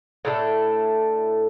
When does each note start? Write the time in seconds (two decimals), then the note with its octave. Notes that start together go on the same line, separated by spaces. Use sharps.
0.25 A2 A3 D4 A4